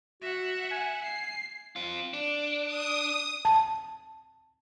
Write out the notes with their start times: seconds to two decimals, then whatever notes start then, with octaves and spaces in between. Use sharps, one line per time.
0.22 F#4 E5 F#5
0.71 G#5
1.03 C7
1.76 C4 F4
2.13 D4
2.66 D#6
3.45 A5